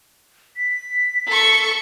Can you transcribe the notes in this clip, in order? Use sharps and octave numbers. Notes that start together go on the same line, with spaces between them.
B6
A4 C#6